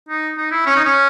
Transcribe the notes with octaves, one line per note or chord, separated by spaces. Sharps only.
D#4
D#4
E4
C#4
D#4
C#4